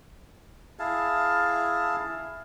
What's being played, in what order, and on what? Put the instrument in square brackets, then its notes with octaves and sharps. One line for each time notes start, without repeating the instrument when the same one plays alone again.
[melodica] E4 G#4 F5 A5